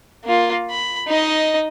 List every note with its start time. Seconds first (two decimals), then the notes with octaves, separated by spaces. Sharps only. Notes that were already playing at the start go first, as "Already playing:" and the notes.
0.24 A#3 F4
0.70 B5
1.08 D#4 D#5